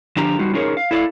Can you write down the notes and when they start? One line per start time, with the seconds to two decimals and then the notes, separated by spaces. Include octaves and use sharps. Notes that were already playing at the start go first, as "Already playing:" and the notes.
0.17 D3 F3 D4 G4 A#5
0.39 G3 D#4 F4 F#4
0.53 C#4 D#4 F4 G#4 A#4 C#5
0.77 F5
0.91 E4 A4 D5 D#5 F5